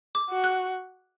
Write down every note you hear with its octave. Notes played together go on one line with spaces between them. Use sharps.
D6
F#4
F#6